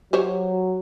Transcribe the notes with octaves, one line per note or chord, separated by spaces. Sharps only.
F#3 G4 C5 C#5